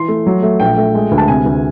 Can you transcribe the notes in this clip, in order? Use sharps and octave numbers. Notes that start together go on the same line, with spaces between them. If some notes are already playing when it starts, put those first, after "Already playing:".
Already playing: E3 C6
A3
F#3
A3
A#1 G5
A3
G#3
D2
A5
C3 G#5
D2